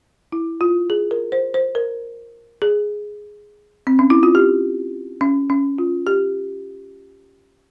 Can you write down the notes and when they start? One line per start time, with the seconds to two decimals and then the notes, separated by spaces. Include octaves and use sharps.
0.32 E4
0.61 F4
0.90 G#4
1.11 A#4
1.32 C5
1.54 C5
1.75 A#4
2.62 G#4
3.87 C4
3.99 C#4
4.10 E4
4.23 F4
4.35 G4
5.21 C#4
5.50 C#4
5.78 F4
6.07 G4